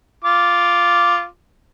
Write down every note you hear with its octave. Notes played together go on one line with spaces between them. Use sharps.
F4 D6